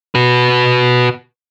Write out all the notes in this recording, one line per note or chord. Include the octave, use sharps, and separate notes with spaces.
F#4 B4